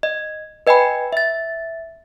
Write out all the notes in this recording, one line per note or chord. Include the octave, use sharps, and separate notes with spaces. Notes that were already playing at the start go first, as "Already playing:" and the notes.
D#5
B4 D#5 G5 G#5 B5
E5 A6